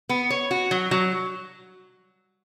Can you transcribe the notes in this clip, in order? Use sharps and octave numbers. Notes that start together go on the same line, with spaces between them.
B3
C#5
F#4
F#3
F#3